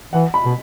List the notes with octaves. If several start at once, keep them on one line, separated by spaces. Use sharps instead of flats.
E3 F#5
B5
B2